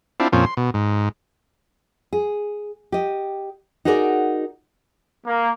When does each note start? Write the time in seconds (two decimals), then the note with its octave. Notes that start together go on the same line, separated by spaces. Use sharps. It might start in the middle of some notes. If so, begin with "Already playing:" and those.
0.20 C4 D4 E4 F4
0.33 F2 A#2 F3 C4 C#4
0.46 C6
0.57 B2
0.74 G#2
2.13 G#4
2.92 G4 D#5
3.85 D#4 F#4 G#4 A#4 C5 D5
5.27 A#3